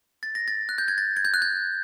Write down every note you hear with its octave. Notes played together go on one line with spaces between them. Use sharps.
A6
A#6
A6
F#6
G6
G#6
A6
G#6
G6
F#6
G6